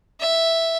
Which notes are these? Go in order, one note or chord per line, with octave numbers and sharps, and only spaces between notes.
E5